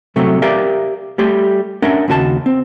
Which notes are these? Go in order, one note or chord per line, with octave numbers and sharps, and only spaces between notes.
C2 C3 F#3 A3
G4 A#4 D5 E5 F5
G3 A3 G4 C6
C#4 D4 A#4 E5 F#5
D#2 C#3 F#4 A#4 A5
C4